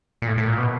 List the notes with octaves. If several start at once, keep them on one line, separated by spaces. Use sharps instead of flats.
A#2
A2
A2
A#2
B2